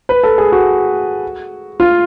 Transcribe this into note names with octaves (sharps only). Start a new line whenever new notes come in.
B4
A4
G#4
F#4
F4